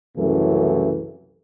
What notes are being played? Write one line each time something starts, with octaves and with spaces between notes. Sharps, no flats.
C2 F#2 C#3 E3 A3